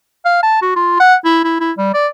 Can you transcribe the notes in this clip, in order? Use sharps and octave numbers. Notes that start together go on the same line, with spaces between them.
F5
A5
F#4
F4
F#5
E4
E4
E4
G3
D5